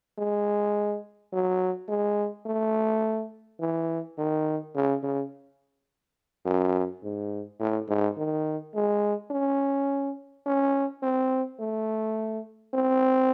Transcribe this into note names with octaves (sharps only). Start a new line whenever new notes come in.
G#3
F#3
G#3
A3
E3
D#3
C#3
C#3
F#2
G#2
A2
G#2
D#3
G#3
C#4
C#4
C4
A3
C4